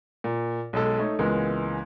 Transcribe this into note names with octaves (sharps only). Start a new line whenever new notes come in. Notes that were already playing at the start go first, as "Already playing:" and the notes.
A#2
B1 G#3 A4
A3 D#4 C#5
C#2 E3 G#3 A#3 B3